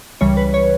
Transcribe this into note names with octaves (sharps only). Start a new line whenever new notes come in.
C#2 C#3 E3 G3 C#5
B4
C#5